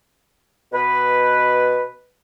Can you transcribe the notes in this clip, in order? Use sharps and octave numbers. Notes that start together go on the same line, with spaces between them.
B2 B4